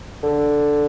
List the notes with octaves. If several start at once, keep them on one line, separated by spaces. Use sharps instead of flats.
D3